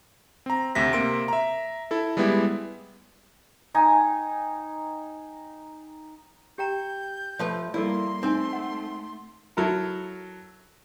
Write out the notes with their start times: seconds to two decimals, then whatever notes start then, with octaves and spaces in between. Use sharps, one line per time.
0.46 C4 A#5
0.75 D2 C3 E5 A#6 B6
0.93 C3 A#3 C6 D7
1.28 E5 A#5
1.91 E4 A4
2.17 G3 G#3 B3 E4 G4
3.74 D#4 G5 G#5 A#5
6.58 G4 G5 A#5 G6
7.39 F3 A3 B4 C#5 A5
7.74 G3 A#3 E4 A4 A#4 D5 C6
8.23 A3 C4 D#4 G#5
8.53 F#5
9.57 F#3 E4 A4 A#4